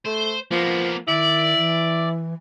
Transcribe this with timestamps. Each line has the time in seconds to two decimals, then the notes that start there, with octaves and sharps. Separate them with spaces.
0.06 A3 C5
0.51 F3 A#3 B3
1.08 D#3 E4 D5
1.58 E3